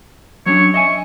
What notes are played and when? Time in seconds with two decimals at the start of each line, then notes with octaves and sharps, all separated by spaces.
0.46 F#3 C#4 D4 C#5
0.74 D#5 E5 G#5 C#6